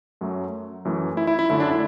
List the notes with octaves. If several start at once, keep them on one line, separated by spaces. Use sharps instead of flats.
F#2 F#3 A3
F#2 E3 A3
E4
E4
E4
F#2 D3 A3 E4
D4
E4